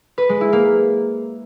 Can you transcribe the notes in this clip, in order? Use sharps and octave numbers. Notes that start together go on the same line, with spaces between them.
B4
G#3
E4
A#3